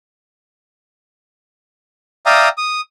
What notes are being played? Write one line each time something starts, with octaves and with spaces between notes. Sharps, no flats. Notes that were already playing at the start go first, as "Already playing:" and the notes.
D5 E5 F5 G5 A#5 D#6
D#6